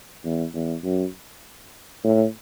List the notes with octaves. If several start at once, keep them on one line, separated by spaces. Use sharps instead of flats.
E2
E2
F#2
A2